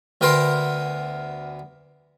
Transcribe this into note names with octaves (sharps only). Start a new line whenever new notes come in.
D2 B3 A#4 G5 C6